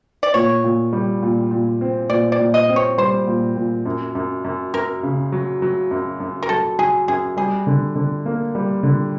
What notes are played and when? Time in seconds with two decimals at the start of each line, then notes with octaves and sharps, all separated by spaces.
0.23 D5
0.34 A#2 C#5
0.64 A#2
0.93 G3
1.23 A#2
1.51 A#2
1.81 C4
2.10 A#2 D5
2.32 D5
2.40 A#2
2.54 D#5
2.69 C4
2.76 C#5
2.98 G3 C5
3.27 A#2
3.56 A#2
3.85 F#2
4.15 F#2
4.44 F#2
4.74 F#2 A#4
5.03 C#3
5.32 F#3
5.62 F#3
5.91 F#2
6.20 F#2
6.42 A#4
6.49 F#3 A4
6.79 F#3 G#4
7.08 F#2 G#4
7.37 G3 G#4
7.67 D3
7.95 D3
8.26 A#3
8.55 G3
8.83 D3